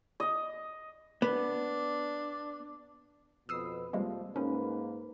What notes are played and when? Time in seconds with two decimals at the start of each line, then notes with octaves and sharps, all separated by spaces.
0.20 D#5
1.22 B3 D4
3.49 F2 B2 B4 D#6 E6 C7
3.93 F2 C3 F3 G3 G#3 A#3
4.36 G#2 A#3 C#4 D#4 B4